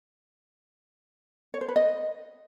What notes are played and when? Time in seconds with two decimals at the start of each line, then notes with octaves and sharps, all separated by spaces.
1.54 C#5
1.61 C5
1.68 B4
1.76 D#5